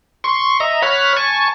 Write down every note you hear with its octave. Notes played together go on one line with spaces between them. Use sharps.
C6 C#6
D#5 E5 A#5
C#5 F#5 B5 F6
G#5 A5 C#6